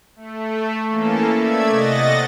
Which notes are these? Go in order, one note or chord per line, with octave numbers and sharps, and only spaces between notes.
A3
E3 A#3 C#4 A4
A3 D5 E5 G#6
C3 D#5 F#5 A6 A#6